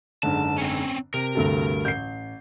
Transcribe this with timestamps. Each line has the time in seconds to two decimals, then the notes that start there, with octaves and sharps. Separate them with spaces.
0.23 F#1 G#2 D3 A5
0.58 C4 C#4
1.14 C3 A#4
1.35 D2 G2 A4
1.85 A1 G6 C7